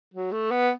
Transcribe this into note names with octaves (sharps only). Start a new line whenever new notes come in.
F#3
A3
B3